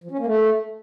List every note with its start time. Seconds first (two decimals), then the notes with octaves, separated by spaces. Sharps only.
0.04 F3
0.11 C#4
0.19 A#3
0.26 A3